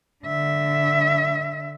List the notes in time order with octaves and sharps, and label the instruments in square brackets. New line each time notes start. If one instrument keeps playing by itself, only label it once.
[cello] D3 E5